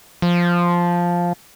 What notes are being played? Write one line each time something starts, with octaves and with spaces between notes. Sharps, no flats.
F3